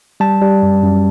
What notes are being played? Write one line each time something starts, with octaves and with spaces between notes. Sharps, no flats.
G3 A5
G3
F#2
F#2